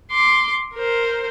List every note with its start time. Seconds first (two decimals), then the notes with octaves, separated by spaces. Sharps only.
0.11 C6 D6
0.74 A#4 C5